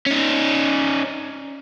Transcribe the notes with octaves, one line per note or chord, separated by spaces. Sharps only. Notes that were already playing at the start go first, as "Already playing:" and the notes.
C#4 D#4